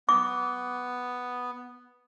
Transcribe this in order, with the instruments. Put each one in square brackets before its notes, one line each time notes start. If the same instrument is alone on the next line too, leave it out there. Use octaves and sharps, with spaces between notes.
[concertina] B3 [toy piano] D6